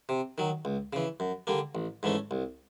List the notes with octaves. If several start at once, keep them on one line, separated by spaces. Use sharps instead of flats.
C3
D#3 F#3
C#2
C#3 E3
F#2
D3 G3 A#3
A1
G#2 E3 A3 C#4
C2